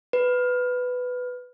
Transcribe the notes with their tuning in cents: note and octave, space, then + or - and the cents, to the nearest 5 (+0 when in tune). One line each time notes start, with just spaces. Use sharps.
B4 +10